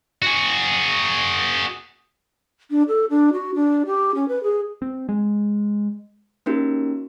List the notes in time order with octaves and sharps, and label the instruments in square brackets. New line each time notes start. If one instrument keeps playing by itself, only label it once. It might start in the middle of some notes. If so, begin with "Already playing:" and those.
[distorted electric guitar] F#4 G#4
[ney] D4
A4
D4
F#4
D4
G4
C#4
B4
G#4
[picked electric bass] C4
G#3
[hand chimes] A#3 C#4 D#4 F#4 G4 A#4